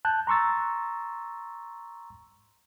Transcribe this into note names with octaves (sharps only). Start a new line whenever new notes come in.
A5 F#6 G6
A#5 C6 C#6 E6 A6